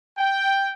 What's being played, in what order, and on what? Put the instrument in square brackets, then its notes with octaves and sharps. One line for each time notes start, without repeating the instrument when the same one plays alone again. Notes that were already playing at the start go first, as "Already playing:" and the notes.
[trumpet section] G5